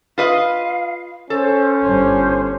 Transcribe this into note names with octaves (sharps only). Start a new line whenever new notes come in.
F4 B4 D#5 F5
C#4 A4 C5
G1 G2 C5